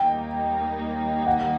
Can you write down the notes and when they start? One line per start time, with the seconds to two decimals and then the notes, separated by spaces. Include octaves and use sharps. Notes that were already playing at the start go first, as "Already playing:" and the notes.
Already playing: D#2 D#3 G3 A#3 D#4 G5
1.27 F#5